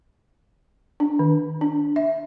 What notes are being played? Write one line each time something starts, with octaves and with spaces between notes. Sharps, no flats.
D4
D#3
D4
E5